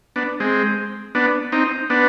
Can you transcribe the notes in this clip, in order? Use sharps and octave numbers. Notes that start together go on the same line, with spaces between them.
B3 D4
G#3 C4
B3 D4
C4 D#4
B3 D4